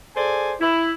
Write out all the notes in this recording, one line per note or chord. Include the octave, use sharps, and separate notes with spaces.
G#4 A4 C5 D5 G#5
E4